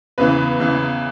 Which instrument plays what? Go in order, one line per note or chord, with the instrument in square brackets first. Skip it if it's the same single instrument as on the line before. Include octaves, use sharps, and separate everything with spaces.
[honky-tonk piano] E2 C#3 E3 B4
E2 C#3 E3